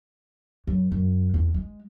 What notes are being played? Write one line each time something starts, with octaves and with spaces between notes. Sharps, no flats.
F#2
F#2
E2
G#3